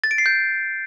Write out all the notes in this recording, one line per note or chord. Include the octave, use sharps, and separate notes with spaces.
A6
D7
C7
G6